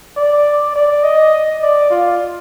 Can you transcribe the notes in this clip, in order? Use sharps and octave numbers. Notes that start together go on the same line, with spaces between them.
D5
D5
D#5
D5
F4